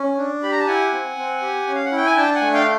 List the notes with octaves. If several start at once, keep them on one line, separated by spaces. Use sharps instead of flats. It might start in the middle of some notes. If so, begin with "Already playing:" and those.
Already playing: C#4
D4
G4 B5
A#5
A5
E4 F#5 G#5
C4
C4
G4
C#4
F5
F#5
E4 G5
G#5
D4 G5 A5
F#5 G#5
A3
F5 G5